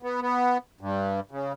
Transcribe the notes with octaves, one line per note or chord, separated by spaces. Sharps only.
B3
B3
G2
C#3